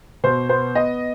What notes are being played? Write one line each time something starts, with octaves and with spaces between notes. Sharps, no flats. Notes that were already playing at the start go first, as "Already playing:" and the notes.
B2 C5
B3 C5
B3 D#5